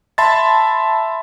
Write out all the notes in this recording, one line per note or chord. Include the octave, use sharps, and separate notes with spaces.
E5 A5 B5 C6 A6